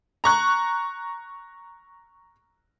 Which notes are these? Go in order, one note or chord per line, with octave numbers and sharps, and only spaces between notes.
A#5 C#6 F#6